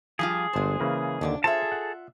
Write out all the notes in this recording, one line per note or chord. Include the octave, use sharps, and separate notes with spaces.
F3 G3 F4 G#4
G1 G#3 C5 A5
C#3 E3 A#3
D#2 D3 D4 C#5 D5
F4 G#4 A4 C5 E5 A5
F#5